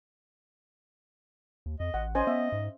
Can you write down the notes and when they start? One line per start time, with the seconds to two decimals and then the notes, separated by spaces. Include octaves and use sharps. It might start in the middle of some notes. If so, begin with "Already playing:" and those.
1.66 D#2
1.80 F2 D#5
1.94 A1 F#5
2.15 C#4 C5 D#5 G#5
2.27 B3 E5
2.52 G#2